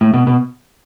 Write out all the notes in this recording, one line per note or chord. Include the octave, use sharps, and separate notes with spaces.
A2
B2
B2